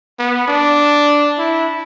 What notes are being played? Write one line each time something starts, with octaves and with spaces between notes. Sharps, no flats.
B3
D4
E4